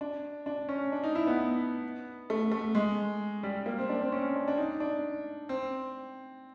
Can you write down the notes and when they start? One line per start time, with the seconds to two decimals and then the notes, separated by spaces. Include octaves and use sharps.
0.01 D4
0.46 D4
0.69 C#4
0.92 D4
1.04 D#4
1.15 E4
1.27 B3
2.30 A3
2.52 A3
2.75 G#3
3.43 G3
3.66 A#3
3.78 C4
3.89 D4
4.01 C4
4.12 C#4
4.35 D4
4.48 D4
4.57 D#4
4.80 D4
5.49 C4